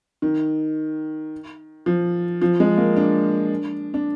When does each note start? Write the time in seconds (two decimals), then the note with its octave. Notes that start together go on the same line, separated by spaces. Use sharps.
0.22 D#3
1.86 F3
2.42 F3
2.60 G#3
2.78 A#3
2.96 D4
3.94 D4